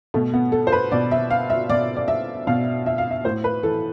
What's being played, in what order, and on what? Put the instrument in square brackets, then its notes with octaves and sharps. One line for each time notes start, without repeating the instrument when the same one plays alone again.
[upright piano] B2 A3
B3
A4
C5
B4
B2 D5
E5
F5
E5
B2 D5
D5
E5
B2 F5
E5
F5
E5
A2 C5
B4
E3 A4